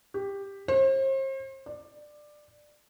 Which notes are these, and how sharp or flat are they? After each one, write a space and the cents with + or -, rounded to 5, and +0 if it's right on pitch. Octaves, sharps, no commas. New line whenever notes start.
G4 +10
C5 +40
D5 +15